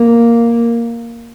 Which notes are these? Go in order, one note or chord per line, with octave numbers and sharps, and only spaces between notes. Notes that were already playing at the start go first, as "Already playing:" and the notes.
Already playing: A#3